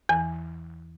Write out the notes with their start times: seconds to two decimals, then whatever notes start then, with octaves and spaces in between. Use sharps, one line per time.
0.09 E2 E3